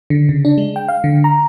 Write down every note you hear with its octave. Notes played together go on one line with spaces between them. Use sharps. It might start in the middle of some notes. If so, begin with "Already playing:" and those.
D3
C#3
D4
G#3
G5
F5
D3
A#5